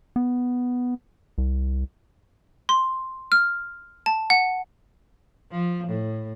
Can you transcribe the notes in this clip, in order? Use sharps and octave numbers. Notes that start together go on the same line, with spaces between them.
B3
C2
C6
F6
A5
F#5
F3
A2